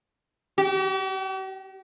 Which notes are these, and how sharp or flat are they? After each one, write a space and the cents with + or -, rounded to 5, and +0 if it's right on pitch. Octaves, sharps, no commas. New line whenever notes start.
G4 -45